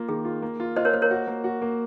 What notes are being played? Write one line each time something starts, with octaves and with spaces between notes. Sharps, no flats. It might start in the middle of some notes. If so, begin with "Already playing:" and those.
Already playing: A#3 F4
D#3 G#4
F4
A#3
F4
F4 C5 D#5
A#4 C#5
A#3 C5
A#4 C#5
F#4
A#3
F#4
A#3